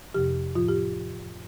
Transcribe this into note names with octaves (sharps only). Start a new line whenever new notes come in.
F2 C3 F3 G4
A2 F3 F4
G4